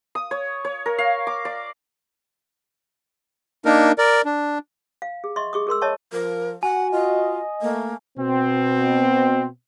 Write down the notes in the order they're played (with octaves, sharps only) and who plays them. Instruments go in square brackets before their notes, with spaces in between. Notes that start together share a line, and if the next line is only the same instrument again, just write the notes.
[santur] D#6
C#5
C#5
A#4
F5
D6
D5
[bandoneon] A#3 D4 D#4 A#4
A#4 D5
D4
[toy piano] F5
G#4
D#5 E5 C6 C#6
G#4 C#6 D#6
G#4 A#4 C6 E6
C#5 D#5 E5 A5 C#6
[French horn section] F3 [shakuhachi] A#4
[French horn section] F#4 [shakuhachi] F#5 [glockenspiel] G#5
[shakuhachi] F4 [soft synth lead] D#5
[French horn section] A3 [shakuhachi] A#3
[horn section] B2 C4